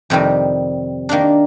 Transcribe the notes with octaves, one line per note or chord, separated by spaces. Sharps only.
F2 C3 D#3 G3
D#3 A#3 D4